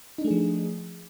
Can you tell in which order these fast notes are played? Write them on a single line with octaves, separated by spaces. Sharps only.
D#4 D4 A3 G#4 F3